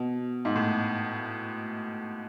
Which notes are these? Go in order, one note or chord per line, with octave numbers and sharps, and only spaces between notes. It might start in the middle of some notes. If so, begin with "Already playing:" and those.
Already playing: B2
G#2
A2